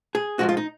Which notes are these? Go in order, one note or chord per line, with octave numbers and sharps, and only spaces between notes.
G#4
G#2 F3 G#3 F#4
F4
D#4